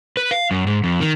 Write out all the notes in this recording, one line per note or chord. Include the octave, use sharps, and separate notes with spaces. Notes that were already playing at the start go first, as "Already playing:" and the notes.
B4
F5
F#2
G#2
F2
D#3